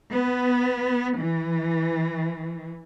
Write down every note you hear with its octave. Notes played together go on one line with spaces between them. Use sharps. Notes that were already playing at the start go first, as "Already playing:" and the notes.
B3
E3